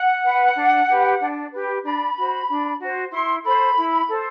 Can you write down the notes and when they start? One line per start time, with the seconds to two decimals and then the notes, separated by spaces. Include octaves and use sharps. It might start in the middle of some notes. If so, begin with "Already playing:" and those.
Already playing: F#5
0.24 B4
0.56 D4
0.89 G4 B4
1.21 D4
1.52 G4 B4
1.84 D4 B5
2.16 F#4 C5
2.48 D4
2.80 F#4 C5
3.12 E4 C6
3.44 A4 C5 B5
3.77 E4
4.08 A4 C5